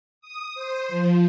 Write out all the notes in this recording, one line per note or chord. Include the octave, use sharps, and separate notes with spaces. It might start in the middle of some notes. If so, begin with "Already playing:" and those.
D#6
C5
F3